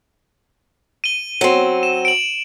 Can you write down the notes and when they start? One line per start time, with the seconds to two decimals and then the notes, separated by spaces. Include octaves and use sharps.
1.04 D#7 G7
1.41 F#3 C4
1.83 E7
2.05 D7 F#7